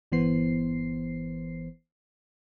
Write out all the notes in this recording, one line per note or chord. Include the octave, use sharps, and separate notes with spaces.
G1 E3 B3 C5 C7